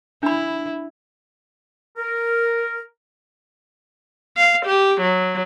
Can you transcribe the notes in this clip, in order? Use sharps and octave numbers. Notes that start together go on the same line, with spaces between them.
D4 E4 B5
A#4
F5
G4
F#3